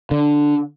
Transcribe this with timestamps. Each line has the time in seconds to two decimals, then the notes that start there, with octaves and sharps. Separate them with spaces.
0.11 D3